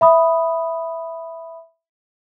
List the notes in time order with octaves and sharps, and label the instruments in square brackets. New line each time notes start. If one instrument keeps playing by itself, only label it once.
[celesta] E5 B5 D#6